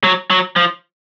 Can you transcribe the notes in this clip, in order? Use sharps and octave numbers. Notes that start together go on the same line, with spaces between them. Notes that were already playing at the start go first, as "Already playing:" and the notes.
F#3
F#3
F3